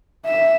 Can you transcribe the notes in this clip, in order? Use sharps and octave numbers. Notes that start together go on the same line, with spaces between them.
E5